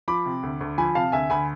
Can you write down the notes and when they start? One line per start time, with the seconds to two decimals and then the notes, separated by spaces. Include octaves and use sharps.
0.08 F3 B5 D6
0.26 C3
0.43 D2
0.61 D2
0.78 F3 G#5 B5
0.95 C3 F5 A5
1.12 D2 E5 G#5
1.30 D2 G#5 B5